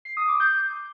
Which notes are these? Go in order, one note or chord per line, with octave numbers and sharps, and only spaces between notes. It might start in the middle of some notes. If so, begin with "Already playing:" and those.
C7
D#6
D6
G6